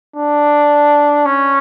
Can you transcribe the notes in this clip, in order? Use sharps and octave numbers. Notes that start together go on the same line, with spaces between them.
D4
C#4